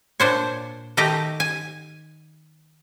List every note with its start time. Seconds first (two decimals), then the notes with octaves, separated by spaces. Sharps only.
0.20 A#2 D4 C5 C#5
0.97 D#3 A3 D#4 G4 D#5 A#5
1.40 G#5